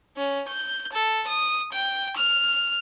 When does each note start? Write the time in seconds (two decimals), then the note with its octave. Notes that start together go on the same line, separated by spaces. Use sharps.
0.17 C#4
0.48 G6
0.93 A4
1.28 D#6
1.73 G5
2.17 F6